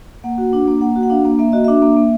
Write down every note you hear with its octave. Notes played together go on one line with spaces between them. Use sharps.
A#3 F#5
F#4
D4
A#3
A#3 F#5
F#4
F#5
D4 F5
A#3
A#3 E5
F#4 D#5
D4 E5
A#3
A#3